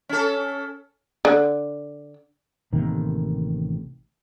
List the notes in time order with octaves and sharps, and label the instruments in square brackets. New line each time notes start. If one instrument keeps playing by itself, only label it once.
[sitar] C#4 A4
[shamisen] D3
[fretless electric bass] A1 C3 D#3 A#3